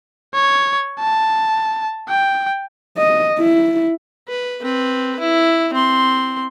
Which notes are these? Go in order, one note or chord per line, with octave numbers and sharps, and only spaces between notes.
C#5
A5
G5
D#5
E4
B4
C4 B4
E4
C4 C6